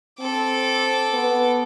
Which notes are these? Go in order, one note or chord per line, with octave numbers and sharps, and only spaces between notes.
C4 A4 D6
B3